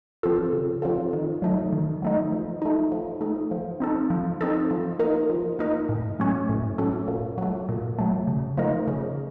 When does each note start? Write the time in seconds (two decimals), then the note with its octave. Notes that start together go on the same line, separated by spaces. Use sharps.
0.23 F3 C4 F4 A4
0.53 C#3
0.82 F3 C4 F4 A4
1.13 D#3
1.42 F#3 A3 D#4
1.73 D#3
2.02 F#3 A3 D#4
2.32 F3
2.62 A3 D#4
2.92 F3
3.21 A3 D#4
3.51 F3
3.80 C4 D#4 A4
4.10 F3
4.41 C4 D#4 A4
4.71 F3
4.99 A#3 D#4 A#4
5.30 F3
5.59 A#3 D#4 A#4
5.89 A2
6.20 F#3 A3 C#4
6.49 A2
6.78 F#3 A3 C#4
7.08 A#2
7.38 F#3 A3
7.69 A#2
7.99 F#3 A3
8.27 C#3
8.57 F3 A3 D#4 A#4
8.88 C#3